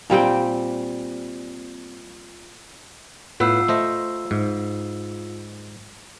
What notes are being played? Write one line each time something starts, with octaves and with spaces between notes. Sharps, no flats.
A#2 G3 C4 G5
A2 B3 F4 B4 E6 C7
A3 C5 D#5
G#2